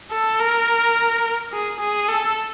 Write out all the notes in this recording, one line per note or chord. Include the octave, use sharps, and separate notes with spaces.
A4
A#4
G#4
G#4
A4